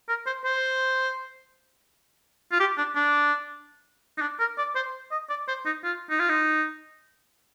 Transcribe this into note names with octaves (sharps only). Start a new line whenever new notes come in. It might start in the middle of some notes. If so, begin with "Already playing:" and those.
A#4
C5
C5
F4
G4
D4
D4
D#4
D4
A#4
D5
C5
D#5
D5
C5
D#4
F4
D#4
F4
D#4